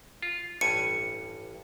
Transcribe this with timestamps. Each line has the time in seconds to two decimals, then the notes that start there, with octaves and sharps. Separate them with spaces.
0.22 F4
0.61 A1 G2 G#5 C#7